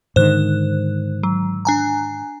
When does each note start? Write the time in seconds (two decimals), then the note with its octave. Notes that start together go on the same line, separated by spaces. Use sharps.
0.16 G#2 D3 D#3 C5 F#6
1.23 F#3
1.65 D4 G#5 A#5